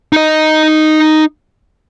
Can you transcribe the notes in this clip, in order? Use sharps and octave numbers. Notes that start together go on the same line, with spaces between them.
D#4 D#5